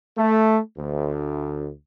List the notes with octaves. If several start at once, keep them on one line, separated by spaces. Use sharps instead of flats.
A3
D2